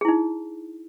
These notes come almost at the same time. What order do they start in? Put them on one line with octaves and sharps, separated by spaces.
G#4 E4 D#4